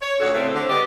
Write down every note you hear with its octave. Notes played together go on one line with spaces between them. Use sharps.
C#5
D2 A#2 C#4 F#4 A4 C#5
A2 C#3 A3 C4
D3 C4
G3 B3 G4 D5 D#5